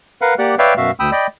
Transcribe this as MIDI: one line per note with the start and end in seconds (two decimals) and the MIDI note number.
0.21 0.34 70
0.21 0.34 71
0.21 0.34 77
0.21 0.34 78
0.39 0.55 58
0.39 0.55 67
0.39 0.55 74
0.39 0.55 78
0.39 0.55 90
0.59 0.74 71
0.59 0.74 73
0.59 0.74 74
0.59 0.74 76
0.59 0.74 77
0.59 0.74 79
0.77 0.91 42
0.77 0.91 47
0.77 0.91 66
0.77 0.91 76
0.77 0.91 77
1.00 1.11 38
1.00 1.11 79
1.00 1.11 83
1.00 1.11 87
1.00 1.11 88
1.12 1.27 74
1.12 1.27 75
1.12 1.27 79
1.12 1.27 83